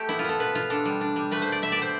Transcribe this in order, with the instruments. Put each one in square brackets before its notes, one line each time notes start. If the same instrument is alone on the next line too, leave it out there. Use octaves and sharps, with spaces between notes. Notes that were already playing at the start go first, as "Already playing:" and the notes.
Already playing: [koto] A3 G4 A4
B3 E4
F4
B3 A4
B2 B4
B2 F4
D4 A4
G3
D4
G3
A3 B4
C5
B2
D5
B2 E5
D5
B2 C5